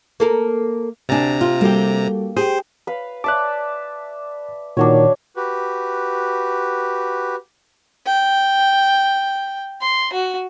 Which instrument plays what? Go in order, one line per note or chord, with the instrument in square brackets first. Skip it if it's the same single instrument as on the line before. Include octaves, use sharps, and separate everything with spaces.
[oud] A#3 A4 A#4
[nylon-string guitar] D2 D4 [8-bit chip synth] C3 A#5 [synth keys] G#5 A6
[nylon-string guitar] F4 [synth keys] G4
[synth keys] G3 F#4 A4 [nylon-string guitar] A#3 G4
[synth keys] G4 G5 [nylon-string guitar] G#4 [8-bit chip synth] C5
[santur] B4 F5
[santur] D5 E5 A5 [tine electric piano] D6 F#6
[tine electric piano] A#2 D#3 [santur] D4 F#4 C#5
[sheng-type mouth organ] F#4 G4 B4
[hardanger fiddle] G5
C6
F#4